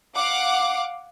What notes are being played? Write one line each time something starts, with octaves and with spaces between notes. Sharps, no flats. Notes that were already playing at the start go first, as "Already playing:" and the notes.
F5 F#5 D6